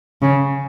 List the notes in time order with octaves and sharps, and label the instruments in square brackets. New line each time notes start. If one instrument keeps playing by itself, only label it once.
[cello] C#3